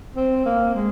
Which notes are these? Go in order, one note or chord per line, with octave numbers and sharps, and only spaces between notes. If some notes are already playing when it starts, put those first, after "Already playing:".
C4
A#3
G#3